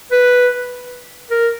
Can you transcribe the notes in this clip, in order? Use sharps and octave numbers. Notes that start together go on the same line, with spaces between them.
B4
A#4